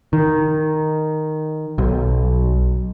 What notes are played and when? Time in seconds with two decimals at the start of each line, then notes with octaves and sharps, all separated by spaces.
0.13 D#3
1.78 B1